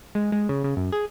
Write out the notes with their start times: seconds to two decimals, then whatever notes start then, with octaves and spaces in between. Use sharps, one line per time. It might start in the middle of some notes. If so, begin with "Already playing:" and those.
0.15 G#3
0.32 G#3
0.49 C#3
0.64 C#3
0.77 F#2
0.92 G#4